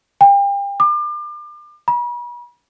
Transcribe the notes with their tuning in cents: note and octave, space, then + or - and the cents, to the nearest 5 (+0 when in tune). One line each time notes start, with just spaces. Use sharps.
G5 +35
D6 +35
B5 -40